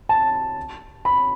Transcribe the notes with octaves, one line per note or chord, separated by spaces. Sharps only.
A5
B5